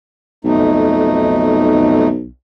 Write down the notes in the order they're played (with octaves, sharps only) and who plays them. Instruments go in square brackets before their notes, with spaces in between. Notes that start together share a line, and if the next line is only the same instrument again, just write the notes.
[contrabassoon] B1 [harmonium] F2 A3 D#4